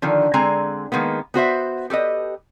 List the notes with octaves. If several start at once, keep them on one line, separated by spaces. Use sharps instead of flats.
D3 D#3 F3
D3 G#3 C4 G#5 A#5
D#3 G#3 A#3 B3
B3 F#4 C5 E5
G4 A4 B4 D#5